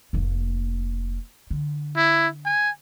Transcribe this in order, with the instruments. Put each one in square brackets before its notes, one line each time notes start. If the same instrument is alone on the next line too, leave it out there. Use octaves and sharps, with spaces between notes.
[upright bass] F1 A#3
D3
[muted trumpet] E4
G#5